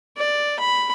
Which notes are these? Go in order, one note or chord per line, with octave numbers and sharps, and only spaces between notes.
D5
B5